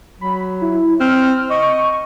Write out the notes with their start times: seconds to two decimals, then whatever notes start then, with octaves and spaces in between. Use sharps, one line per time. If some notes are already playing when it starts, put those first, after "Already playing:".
0.21 F#3 B5
0.62 E4
1.00 C4 F6
1.50 D#5 C#6